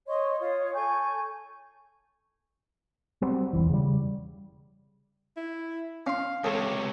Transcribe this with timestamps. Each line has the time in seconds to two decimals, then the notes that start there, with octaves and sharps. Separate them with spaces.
0.07 C#5 D#5 C6 C#6
0.38 F4 C#5 D#6
0.73 A4 G#5 C#6 G6
3.22 F#3 G3 C4
3.53 E1 C#2 E3
3.70 C#3 G3
5.37 E4
6.07 C#4 F5 C6
6.44 C#2 C3 G#4 A4 C#5